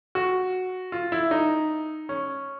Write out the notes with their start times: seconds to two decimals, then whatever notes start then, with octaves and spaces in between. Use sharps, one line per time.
0.15 F#4
0.92 F4
1.12 E4
1.31 D#4
2.09 C#4